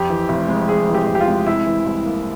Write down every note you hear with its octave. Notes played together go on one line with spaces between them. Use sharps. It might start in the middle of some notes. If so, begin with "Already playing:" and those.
Already playing: F2 G4
E3
F1
G#3
F2 G#4
E3
G4
F1
G4
F4
G#3
C3 E4
E3
C2
A#3